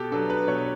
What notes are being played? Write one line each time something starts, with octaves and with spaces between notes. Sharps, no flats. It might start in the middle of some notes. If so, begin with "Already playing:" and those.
Already playing: B2 G4 A4
F#3 B3 D4 A4
B4
B2 C#5